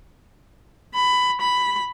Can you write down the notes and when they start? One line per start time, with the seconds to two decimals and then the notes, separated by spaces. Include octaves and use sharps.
0.95 B5
1.41 B5